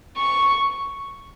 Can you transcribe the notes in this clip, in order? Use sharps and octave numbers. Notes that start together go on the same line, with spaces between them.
C#6